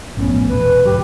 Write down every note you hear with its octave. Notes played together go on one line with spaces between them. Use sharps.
A#1 A2 B3 C#4
E1 B4
D2 G#2 F#3 G4